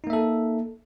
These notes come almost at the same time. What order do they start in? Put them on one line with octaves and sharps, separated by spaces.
D#4 A#3 E5 A4